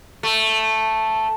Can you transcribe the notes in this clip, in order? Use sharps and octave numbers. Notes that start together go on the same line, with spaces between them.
A3